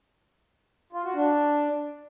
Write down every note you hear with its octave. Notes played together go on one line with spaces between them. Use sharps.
F4
F#4
D4